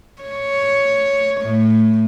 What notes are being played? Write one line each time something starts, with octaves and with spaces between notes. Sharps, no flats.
C#5
A2